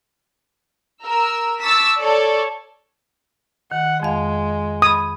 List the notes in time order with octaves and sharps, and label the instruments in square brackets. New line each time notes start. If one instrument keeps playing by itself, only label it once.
[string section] A#4 E6
A5 C#6 D6 E6 A6 B6
A4 C#5 D5
[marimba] D#3 [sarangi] F#5
[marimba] F2 F5 [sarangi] G#3
[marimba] B5 G#6 [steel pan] D#6